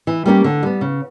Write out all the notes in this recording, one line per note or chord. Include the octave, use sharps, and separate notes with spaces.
E3
G3 A#3 C#4 G4
D3
G3 B3
C#3